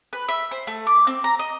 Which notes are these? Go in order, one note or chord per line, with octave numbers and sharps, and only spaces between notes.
B4
E5
C5
A3
D6
C4
A#5
D#5